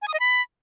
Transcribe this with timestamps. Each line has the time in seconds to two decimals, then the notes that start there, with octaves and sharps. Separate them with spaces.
0.02 G#5
0.08 D#6
0.14 D#5
0.20 B5